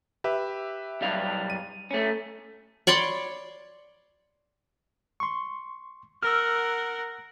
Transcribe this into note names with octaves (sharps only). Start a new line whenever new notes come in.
G4 B4 E5
B1 G3 F5
D#7
A3 C#4
C#5 D5 B5 C6
C6 C#6
A#4 F#5 E6 F6